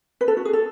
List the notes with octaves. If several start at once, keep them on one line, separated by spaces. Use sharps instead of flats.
B4
A4
F#4
G#4
A4